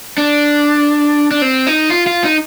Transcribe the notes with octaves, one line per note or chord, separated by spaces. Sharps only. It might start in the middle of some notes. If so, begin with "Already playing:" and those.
D4
D4
C4
D#4
F4
F4
D#4